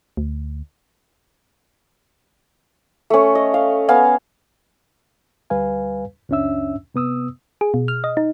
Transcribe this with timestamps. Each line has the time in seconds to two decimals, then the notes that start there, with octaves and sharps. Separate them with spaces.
0.17 D2
3.10 A3 C#4
3.35 D#5
3.54 F5
3.89 B3 F5 G#5
5.50 D2 G3 B4 F5 G#5
6.29 C#2 F#2 C#4 D4 E5 E6
6.94 C3 B3 D#6 E6
7.61 G#4
7.74 B2
7.88 F6
8.04 D#5
8.17 D#4